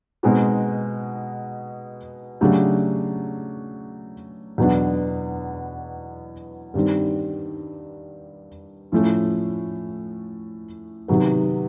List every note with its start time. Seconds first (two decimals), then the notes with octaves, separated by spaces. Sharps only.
0.23 B2 G#3 C4 D#4 F#4
2.41 C#3 F#3 A3 D4 G4
4.58 E2 B2 F#3 B3 D4
6.74 G2 D#3 G3 C4
8.92 A2 F3 A3 C#4
11.08 C3 D#3 F#3 B3